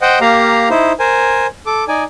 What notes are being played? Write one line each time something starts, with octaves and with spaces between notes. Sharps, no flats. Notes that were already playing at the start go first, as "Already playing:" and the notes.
C5 D#5 F#5 G5
A#3 G4 F5 A#5
D#4 E4 C5
A#4 C5 G#5
A4 D6
D#4 D5 G#5